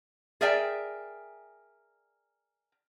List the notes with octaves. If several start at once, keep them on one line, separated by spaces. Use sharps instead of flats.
G#4 A#4 D5 E5 G5 G#5